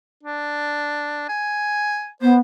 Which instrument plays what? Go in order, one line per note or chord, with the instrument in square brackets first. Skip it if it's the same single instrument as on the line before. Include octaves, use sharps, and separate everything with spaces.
[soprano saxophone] D4
G#5
[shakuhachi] B3 [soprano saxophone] C5